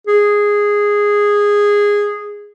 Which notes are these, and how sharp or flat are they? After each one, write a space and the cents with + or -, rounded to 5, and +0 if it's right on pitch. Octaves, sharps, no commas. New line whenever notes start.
G#4 -10